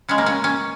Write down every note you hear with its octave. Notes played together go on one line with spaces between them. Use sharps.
C#3 G#3 C#4
A#3
C#4
C#4